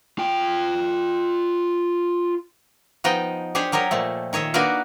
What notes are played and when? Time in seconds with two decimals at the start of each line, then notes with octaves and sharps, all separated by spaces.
0.18 F4 G5
3.04 F3 B3 D#4 D#5 G5
3.55 D4 G4 G#4 C5 C#5
3.72 F#3 G4 A#4 C#5 D#5
3.91 A#2 F3 A3
4.33 D#3 C#5 D#5 E5
4.54 A#3 D4 D#4 F#4 A#4 B4